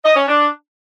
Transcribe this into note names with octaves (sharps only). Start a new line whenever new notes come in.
D#5
C#4
D4